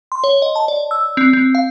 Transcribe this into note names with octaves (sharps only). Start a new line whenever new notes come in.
C6
C#5
D#5
A5
D5
E6
C4
C4
F5